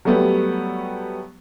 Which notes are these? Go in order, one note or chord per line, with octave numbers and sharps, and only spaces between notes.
F#3 G3 A3 B3 G4